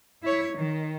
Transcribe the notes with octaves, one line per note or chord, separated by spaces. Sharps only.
E4 C#5
D#3